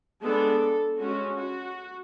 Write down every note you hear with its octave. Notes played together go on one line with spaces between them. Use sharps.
G#3 B3 D4 A4
G#3 C#4 F#4
F#4